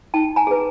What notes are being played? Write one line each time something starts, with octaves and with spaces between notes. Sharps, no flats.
D#4 G5 A5
G#5 A#5
G#4 B4